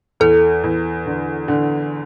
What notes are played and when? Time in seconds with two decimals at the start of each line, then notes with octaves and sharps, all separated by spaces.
0.20 E2 A4
0.64 E2
1.06 D3
1.48 D3